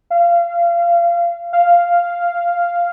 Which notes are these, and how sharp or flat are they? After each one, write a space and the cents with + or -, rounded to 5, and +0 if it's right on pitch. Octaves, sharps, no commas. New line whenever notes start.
F5 -25
F5 -5